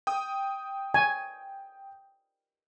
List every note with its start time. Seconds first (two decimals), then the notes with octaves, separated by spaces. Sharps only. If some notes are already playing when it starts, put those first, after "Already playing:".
0.07 G5 D#6
0.94 G#5